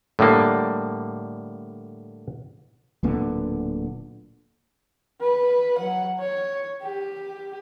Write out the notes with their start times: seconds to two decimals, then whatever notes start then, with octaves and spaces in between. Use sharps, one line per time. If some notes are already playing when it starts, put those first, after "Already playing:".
0.19 A2 D3 G3 A#3
3.03 D1 A#2 D3 B3
5.22 B4
5.78 F#3 F#5
6.20 C#5
6.82 G4